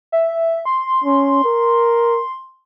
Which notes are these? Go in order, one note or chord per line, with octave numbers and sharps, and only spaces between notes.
E5
C6
C#4
A#4